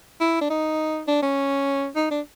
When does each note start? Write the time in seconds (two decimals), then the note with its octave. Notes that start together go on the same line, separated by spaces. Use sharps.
0.20 E4
0.41 D4
0.50 D#4
1.08 D4
1.23 C#4
1.96 D#4
2.11 D4